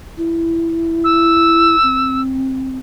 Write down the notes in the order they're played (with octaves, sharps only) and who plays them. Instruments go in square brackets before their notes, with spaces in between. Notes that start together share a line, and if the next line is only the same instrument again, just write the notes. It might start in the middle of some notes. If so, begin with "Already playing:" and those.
[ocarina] E4
[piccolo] E6
[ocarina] C4